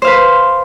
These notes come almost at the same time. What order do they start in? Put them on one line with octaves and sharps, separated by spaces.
C5 F5 B4